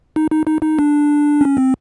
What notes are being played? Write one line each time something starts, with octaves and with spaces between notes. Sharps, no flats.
D#4
D#4
D#4
D#4
D4
C#4
C4